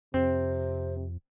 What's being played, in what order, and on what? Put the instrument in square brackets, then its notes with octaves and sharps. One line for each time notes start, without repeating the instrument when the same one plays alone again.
[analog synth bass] F2 [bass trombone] C3 [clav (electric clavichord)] C4 [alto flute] C5